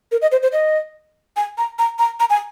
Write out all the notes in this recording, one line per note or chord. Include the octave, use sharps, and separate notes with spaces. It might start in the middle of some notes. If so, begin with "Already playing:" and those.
A#4
D#5
C5
C5
D#5
G#5
A#5
A#5
A#5
A#5
G#5